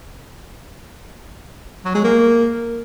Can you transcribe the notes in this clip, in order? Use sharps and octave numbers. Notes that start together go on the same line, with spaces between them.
F#3
G#3
A#3